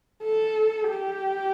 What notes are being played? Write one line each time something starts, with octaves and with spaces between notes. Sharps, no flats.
A4
G4